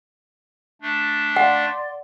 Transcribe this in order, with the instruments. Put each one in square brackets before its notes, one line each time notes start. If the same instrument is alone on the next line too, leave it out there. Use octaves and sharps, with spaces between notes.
[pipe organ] A3 D4
[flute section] D5 C6 [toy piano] F5 F#5